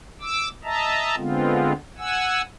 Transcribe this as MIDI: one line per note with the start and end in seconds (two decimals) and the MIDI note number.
0.21 0.48 86
0.21 0.48 88
0.64 1.15 75
0.64 1.15 76
0.64 1.15 81
0.64 1.15 82
1.17 1.72 50
1.17 1.72 56
1.17 1.72 59
1.17 1.72 60
1.17 1.72 65
1.98 2.42 78
1.98 2.42 80
1.98 2.42 88